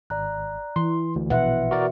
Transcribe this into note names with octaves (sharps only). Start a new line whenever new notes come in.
G#1 D5 A#5 F#6
E3 C6
D2
A#1 B2 B4 E5 F#5 C6
F#4 A#4 D5